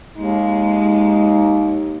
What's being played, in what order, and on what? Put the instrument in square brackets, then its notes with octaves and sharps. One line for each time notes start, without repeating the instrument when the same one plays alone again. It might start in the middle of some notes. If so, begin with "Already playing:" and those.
[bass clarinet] D#2 [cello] G#3 [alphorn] D#4